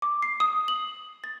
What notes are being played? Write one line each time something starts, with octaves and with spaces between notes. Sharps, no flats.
D6
C7
D#6
F#7
A6